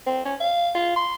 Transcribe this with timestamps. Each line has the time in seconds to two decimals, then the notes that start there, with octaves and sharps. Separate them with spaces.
0.06 C4
0.25 C#4
0.40 F5
0.75 F4
0.96 C6